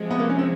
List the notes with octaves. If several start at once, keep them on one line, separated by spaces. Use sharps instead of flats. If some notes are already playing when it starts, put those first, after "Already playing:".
Already playing: C3 F3 G#3
B3
A#3
C#4
C4